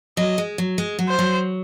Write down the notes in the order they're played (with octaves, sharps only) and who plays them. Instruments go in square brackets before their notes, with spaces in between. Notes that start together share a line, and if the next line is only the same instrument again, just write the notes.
[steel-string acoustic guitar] F#3 [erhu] D#5
[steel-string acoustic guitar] G#3
F#3
G#3
F#3
[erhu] C5
[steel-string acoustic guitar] F#3